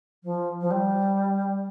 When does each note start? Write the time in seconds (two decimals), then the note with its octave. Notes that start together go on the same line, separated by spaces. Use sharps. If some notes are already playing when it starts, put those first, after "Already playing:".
0.23 F3
0.60 F3
0.71 G3